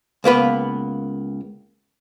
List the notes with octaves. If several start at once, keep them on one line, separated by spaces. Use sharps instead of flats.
C#2 A#3 B3 B4